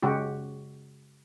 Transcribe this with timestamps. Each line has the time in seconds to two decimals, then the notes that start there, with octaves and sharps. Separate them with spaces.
0.03 C#3 G#3 F#4 G4